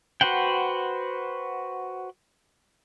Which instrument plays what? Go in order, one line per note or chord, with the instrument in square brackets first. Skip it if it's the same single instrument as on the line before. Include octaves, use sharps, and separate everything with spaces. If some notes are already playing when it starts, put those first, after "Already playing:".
[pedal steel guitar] F#4 B4 C5 F#5 G5